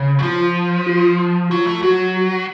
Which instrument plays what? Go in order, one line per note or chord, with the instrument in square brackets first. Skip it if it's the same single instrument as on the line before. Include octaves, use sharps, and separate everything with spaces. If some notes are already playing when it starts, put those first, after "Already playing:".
Already playing: [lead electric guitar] C#3
F#3
[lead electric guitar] F3 [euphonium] F4
[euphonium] F4
[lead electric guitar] F#3 [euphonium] F4
[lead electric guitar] A3
[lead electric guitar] F#3 [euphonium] F#4
[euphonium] F#4